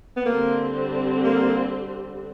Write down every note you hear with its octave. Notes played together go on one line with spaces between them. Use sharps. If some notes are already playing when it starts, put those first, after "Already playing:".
B3
D3 G3 A#3 C4
A#3